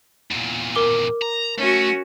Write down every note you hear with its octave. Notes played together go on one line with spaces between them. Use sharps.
E2 A#2
A#4 D6 G7
A#5
A3 C#4 F#4